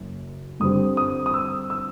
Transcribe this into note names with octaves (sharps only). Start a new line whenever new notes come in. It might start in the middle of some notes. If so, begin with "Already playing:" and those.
Already playing: F#1 F#2
G2 D3 G3 C4 D#6
D#6
D#6
E6
E6